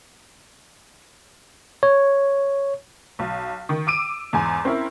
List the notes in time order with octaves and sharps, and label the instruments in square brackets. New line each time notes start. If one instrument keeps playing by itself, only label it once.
[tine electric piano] C#5
[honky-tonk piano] B1
D#3
D6 E6 D7 D#7
E2 G#2 G#5
C4 C#4 E4 A#4